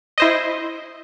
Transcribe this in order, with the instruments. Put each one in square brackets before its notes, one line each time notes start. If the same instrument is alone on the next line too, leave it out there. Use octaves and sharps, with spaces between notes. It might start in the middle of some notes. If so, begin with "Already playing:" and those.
[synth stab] E4 C5 D#5